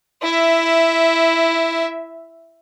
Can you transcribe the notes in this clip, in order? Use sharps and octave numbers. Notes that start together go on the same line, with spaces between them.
E4 E5